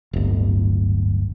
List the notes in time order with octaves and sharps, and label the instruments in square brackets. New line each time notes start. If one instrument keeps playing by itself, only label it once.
[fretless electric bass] D1 G1